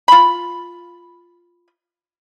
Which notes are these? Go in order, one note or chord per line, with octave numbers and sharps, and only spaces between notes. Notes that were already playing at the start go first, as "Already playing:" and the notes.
F4 B5